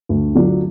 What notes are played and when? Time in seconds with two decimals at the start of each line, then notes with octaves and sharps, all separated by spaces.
0.09 D2
0.35 D3 F#3 D4 F4